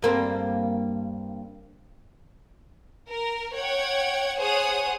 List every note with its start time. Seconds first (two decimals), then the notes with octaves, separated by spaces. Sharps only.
0.02 G2 A#3 C4
3.10 A#4
3.55 C#5 F#5 G5 G#6
4.39 G#4 C5 C#5 F#5 D#6